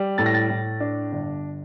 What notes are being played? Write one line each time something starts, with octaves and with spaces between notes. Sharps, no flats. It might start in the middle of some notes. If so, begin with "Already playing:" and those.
Already playing: G3
A2 A6
A#6
A6
A2
D4
G1